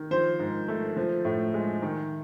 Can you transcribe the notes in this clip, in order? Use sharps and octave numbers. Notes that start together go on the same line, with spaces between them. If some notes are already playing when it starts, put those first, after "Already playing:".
Already playing: D#3
F3 C5
G#2
A3
F3
A2
G#3
D#3